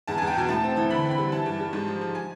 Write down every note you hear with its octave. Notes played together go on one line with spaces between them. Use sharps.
E2 A5
E2 G#5
G5
B2 G#5
A2 A5
C4
E3
D3 B5
C4
B5
G3
E3 A5
G2
G3
G#2
F3
F3
G#5